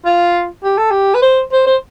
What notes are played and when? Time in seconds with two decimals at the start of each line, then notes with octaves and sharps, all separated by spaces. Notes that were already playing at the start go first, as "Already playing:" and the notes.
0.05 F4
0.63 G4
0.78 A4
0.91 G4
1.14 B4
1.22 C5
1.52 C5
1.66 C5